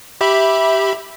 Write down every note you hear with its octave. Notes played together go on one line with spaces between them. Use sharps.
G4 E5 B5